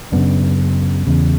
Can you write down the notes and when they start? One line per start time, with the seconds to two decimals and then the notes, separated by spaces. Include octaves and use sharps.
0.12 F#2 C#3 B3 D4
1.07 E2 C#3